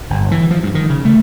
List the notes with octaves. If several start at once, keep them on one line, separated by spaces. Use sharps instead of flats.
G1
E3
F3
G2
D#3
C#3
A3